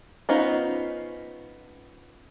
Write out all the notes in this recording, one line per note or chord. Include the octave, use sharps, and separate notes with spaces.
B3 C#4 D#4 F4 C5